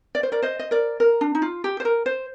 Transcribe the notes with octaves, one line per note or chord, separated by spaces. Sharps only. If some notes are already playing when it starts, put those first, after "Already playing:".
D5
C5
A#4 D5
C5 D#5
D#5
A#4 D5
A#4
D4
D#4
F4
G4
C5
A#4
C5